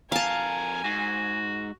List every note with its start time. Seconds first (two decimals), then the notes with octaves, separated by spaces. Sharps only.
0.12 F2 A#4 F5 G#5 A5
0.84 G#2 F#4